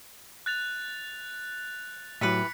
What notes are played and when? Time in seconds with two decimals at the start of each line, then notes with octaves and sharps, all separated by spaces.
0.46 F#6 A6 F7
2.21 A2 E3 F#3 G4 B4 B6 C#7